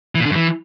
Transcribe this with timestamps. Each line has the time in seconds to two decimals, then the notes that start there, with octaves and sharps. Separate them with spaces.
0.15 E3
0.20 A#2
0.25 D3
0.31 F#2
0.36 E3